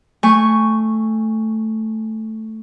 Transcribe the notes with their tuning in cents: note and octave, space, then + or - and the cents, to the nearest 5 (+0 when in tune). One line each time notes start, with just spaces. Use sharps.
A3 +0 G#5 -15 C#6 +0